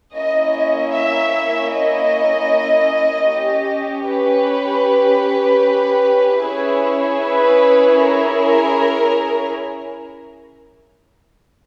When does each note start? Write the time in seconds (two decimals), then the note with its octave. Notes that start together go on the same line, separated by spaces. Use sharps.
0.15 A#3 C#4 E4 D#5
0.55 D#5
0.94 E5
1.72 D#5
3.30 C#4 G4
4.07 B4
6.44 C#4 E4 G#4
7.22 B4
8.01 A#4
8.40 A#4